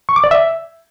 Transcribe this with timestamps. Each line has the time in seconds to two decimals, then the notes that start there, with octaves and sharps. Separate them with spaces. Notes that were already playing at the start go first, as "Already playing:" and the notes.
0.09 C#6
0.16 D6
0.24 D5
0.31 E5